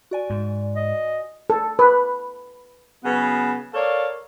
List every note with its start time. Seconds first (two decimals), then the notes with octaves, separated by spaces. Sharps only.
0.11 F#4 D5 G#5
0.30 G#2
0.76 D#5
1.50 A4
1.79 B4
3.04 C#3 F#3 B3
3.74 A4 A#4 C#5 D5 F5